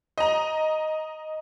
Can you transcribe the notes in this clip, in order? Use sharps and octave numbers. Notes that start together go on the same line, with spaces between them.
D#5 A#5